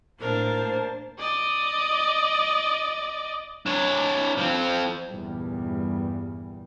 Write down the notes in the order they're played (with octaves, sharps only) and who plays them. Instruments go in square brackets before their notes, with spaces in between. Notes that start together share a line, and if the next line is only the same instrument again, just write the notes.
[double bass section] A2 [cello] A#3 D4 [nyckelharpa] A#4 [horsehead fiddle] C5 A5
[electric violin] D5 D#5
[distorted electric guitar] D4 C#5
F3 C4
[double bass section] E2 G2 A#2 G3